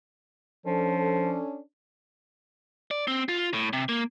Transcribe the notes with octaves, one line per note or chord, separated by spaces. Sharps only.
F3 C#4 D4 A4
D5
C4
F4
A2
C3
A#3